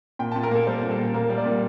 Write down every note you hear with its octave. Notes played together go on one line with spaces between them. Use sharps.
A#2 G5
A5
A#2
A#4
A#3 A4
G3 C5
A#2
A4
A#2
A#3 A#4
G3
D5
A#2